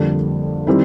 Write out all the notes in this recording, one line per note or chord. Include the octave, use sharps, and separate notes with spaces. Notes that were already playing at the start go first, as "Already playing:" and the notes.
Already playing: F2 D3 G3 A#3 D4
D#3 G3 C4 E4